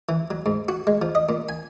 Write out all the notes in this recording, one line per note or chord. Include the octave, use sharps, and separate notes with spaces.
E3
F#3
G#2
F#4
G#3
F3
D#5
A#2
G#5